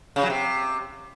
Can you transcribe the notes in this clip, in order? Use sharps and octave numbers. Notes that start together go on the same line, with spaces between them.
C#3
F#3
C3